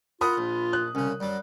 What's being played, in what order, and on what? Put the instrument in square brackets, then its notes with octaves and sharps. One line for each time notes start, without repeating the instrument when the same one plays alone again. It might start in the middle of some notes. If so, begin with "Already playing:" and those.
[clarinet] F4 [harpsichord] A#4 F#5 [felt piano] B5 D#6
[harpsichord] A#1
[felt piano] F#6
[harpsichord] C2 C#3 [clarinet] C#4
[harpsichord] F#2 F#3 [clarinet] G3